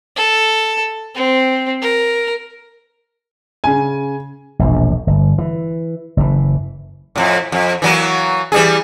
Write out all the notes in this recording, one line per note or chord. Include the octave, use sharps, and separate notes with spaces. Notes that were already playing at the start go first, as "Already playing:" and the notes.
A4
C4
A#4
C#3 G#5
E1 A#1
G1
E3
F#1 A2 E3
F2 A2
F2
E3 F#3 A#3
E3 G3 G#4